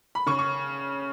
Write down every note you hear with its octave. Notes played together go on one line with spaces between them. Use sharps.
B5
C#3 C#6
C#6